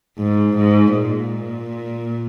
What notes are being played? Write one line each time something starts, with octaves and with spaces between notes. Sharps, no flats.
G#2
G#2
A#2